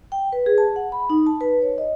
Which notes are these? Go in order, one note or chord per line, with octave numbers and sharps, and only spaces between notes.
G5
B4
G#4
A5
F#5
B5
D#4
A5
B4
C#5
D#5